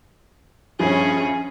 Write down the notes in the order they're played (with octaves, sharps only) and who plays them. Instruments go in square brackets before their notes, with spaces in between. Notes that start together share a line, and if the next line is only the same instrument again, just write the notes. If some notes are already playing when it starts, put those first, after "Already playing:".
[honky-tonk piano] A#1 G2 F3 [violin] C#4 G#4